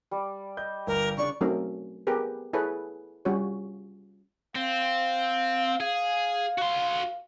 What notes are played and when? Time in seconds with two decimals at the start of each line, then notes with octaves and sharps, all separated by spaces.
0.11 G3 D5
0.57 D#5 G6
0.87 G1 A#4
1.18 C#3 D4 D5 C#6
1.41 F#3 A3 C4 C#4 D#4 A#4
2.07 B3 G4 G#4 A#4 B4
2.53 E4 G#4 A4 B4 C#5
3.25 G3 C#4 F4 F#4 C#5
4.56 C4 F5
5.80 G#4 F5
6.58 F#4 C6